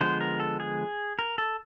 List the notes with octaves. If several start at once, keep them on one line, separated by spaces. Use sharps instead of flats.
D3 F3 G#3 B3 C5
A#4
A4
G#4
A#4
A4